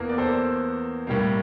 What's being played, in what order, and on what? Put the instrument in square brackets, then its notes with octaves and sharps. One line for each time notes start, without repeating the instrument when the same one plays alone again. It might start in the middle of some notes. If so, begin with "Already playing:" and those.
Already playing: [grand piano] E2 E3 A#3
D5
A4 C5
A2 G3 A#3